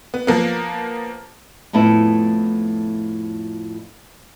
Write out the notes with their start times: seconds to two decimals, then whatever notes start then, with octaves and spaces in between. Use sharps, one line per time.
0.14 B3
0.27 F3 A#3 B3
1.73 F2 A2 A3 B3 E4